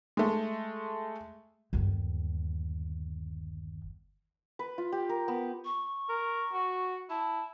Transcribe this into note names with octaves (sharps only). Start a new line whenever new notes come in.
G#3 A3
G1 D#2
B4
F4
G4
A#4
B3
C#6
A#4
F#4
E4 A5